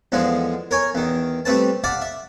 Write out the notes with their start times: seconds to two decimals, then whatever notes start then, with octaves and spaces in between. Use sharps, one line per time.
0.12 E2 D3 F3 G#3
0.71 A#4 C#5 G#5
0.95 E2 D#3
1.45 G3 A3 C4 B4 A5
1.84 D5 F5 F#5 A5 B5
2.02 E5